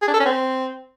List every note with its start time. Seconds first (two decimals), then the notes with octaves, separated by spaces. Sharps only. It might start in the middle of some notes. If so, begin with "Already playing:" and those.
0.02 G#4
0.08 D4
0.14 A4
0.20 C#4
0.26 C4